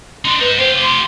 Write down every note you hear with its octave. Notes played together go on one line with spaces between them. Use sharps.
D4 D#4 C6
D#4 B4 C5
F4 G4 C5
C6